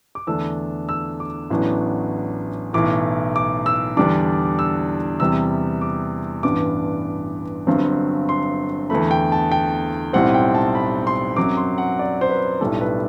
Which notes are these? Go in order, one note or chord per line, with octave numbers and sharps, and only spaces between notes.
D6
E2 D3 A3 D4 E6
E6
D6
A1 A2 F#3 B3 D4
B1 A2 E3 D6
D6
E6
E2 D3 G3 D4 D6
E6
E2 C3 G3 E6
D6
A1 G2 E3 B3 D4 D6
G1 G2 F#3 C4
C6
E2 D3 A3 B5
G5
A5
G5
B1 A2 G3 C4 F#5
G5
A5
B5
C6
F#2 F#3 C4 D6
C6
F#5
D5
C5
B4
B1 A2 G3 D4 A4
B4